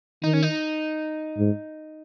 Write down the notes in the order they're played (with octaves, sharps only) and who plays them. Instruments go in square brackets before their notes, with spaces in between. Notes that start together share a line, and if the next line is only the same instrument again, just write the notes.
[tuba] D#3 [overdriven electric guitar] D#4
[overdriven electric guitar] C#4
D#4
[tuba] G#2